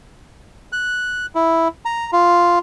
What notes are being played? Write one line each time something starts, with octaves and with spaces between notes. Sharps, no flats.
F#6
E4
A#5
F4